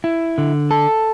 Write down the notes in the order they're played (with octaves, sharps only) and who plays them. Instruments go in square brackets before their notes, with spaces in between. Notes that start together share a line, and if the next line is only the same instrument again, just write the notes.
[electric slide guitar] E4
D3
A4